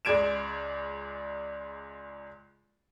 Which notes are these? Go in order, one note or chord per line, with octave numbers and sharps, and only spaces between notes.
C#2 G#3 D5 G#6 D7 E7